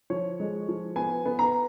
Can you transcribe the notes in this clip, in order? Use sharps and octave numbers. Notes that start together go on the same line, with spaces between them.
F3 C#5
G#3
F3
B3 G#5
B3
A#5